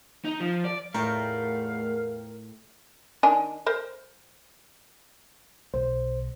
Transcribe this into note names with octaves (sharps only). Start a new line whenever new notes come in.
D#4
F3
D5
E2 A2 A3 F4 A#4 F5 G5 A5
D#3 D4 G#5
A#4 C5
B1 C5